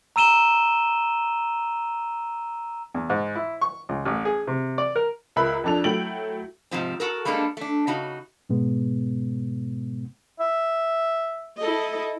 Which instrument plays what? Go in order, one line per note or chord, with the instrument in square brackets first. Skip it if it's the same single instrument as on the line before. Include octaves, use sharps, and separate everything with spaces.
[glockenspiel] A#5 E6 D#7 E7 G7
[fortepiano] E2
G#2
E4
C#6
C#2
A1
G#4
C3
D5
A#4
[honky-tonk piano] C#2 A#4 B4 E5 B5 F#6
F2 F3 D4 A4 F7
F#3 A3 E4 G5 D7 F#7
[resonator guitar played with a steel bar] G#2 C3 F3 C4
F#4 A4 A#4
G3 G#3 A#3 D4 A4
A3 D4
C#3 D#4 F#4
[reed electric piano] G#2 B2 G#3 B3
[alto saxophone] E5
[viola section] E4 A4 D#5